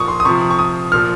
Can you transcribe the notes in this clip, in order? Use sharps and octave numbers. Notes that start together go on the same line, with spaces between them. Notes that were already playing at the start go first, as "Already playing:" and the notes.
Already playing: A#2 F3 C#6 D#6
C6
D#6
C3 F3 C#6
C#6
D#6
A#2 F3 F6